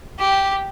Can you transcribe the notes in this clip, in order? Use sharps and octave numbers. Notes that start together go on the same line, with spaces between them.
G4